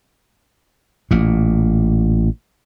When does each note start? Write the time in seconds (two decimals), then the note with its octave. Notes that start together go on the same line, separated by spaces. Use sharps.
1.11 A1 A#2